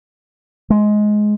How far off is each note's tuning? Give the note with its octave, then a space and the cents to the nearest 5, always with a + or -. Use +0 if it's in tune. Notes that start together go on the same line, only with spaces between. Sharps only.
G#3 +15